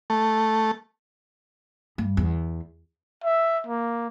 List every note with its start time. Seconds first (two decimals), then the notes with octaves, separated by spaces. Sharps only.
0.10 A3
1.98 G2
2.17 E2
3.24 E5
3.67 A#3